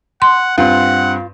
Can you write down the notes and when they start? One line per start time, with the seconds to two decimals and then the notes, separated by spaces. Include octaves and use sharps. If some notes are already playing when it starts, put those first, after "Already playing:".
0.22 F#5 C6
0.58 G2 C4 F4 F#5